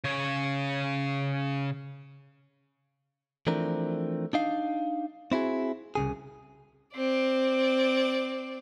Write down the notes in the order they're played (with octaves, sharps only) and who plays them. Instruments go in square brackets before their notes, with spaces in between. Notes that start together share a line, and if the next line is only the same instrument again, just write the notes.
[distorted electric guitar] C#3 C#5
[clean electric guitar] E3 F3 A3 C4 D4 A#4
D4 D#4 F5
C4 E4 F#4 G#4
C2 C#3 G#4
[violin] C4 D5